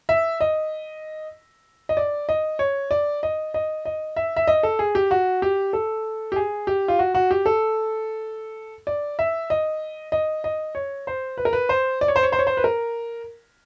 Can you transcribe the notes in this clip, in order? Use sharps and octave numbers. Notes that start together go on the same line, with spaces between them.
E5
D#5
D#5
D5
D#5
C#5
D5
D#5
D#5
D#5
E5
E5
D#5
A4
G#4
G4
F#4
G4
A4
G4
G#4
G4
F4
F#4
F#4
G4
A4
D5
E5
D#5
D#5
D#5
C#5
C5
B4
A#4
B4
C5
D5
C#5
C5
C#5
C5
C#5
C5
B4
A#4